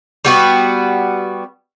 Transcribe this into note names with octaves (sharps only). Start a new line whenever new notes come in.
G3 B3 F#4